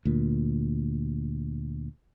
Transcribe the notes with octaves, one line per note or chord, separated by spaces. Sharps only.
D2 A#2